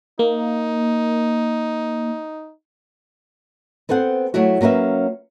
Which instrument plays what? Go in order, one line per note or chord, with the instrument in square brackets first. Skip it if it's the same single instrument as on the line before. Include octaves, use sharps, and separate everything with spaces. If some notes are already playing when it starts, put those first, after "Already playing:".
[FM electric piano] A#3 [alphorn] D#4
[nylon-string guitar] B3 C4 A4 C5 F#5
F#3 A3 E4 F#4
F#3 A#3 C#4 B4 E5